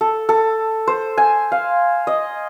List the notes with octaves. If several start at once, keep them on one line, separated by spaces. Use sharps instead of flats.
A4
A4
C5
G#5
F5
D#5